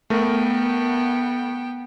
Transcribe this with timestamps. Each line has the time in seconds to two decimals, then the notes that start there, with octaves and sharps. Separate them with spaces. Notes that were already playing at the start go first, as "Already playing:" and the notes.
0.10 A3 B3 A#4 G5